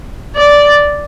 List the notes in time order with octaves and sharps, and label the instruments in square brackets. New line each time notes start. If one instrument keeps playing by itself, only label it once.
[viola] D5